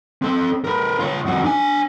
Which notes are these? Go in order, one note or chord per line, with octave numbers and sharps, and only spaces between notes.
C4 A4
A#4 B4
F4 C#5
F2 F#4
D4 G#5